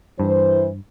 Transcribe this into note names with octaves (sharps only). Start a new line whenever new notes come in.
G2 E3 C5